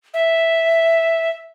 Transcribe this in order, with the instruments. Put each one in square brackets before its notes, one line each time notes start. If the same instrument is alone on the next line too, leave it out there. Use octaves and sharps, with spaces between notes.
[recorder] E5